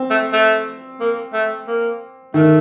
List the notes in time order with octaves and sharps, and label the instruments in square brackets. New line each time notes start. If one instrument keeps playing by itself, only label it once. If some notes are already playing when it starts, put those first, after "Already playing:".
Already playing: [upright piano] C4
[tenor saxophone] A3
A3
A#3
A3
A#3
[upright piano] D#3 [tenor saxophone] A3